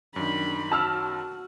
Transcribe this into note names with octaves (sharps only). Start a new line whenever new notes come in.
F#2 D#3 D4 B5
F#4 A5 E6 F6